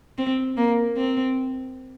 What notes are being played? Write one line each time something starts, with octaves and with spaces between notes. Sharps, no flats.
C4
A#3
C4